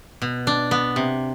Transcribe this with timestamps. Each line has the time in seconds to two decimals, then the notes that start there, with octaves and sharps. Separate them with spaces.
0.22 B2
0.47 D4
0.71 B3
0.96 C3